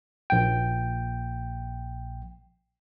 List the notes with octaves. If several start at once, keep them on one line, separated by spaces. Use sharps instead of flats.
A#1 G5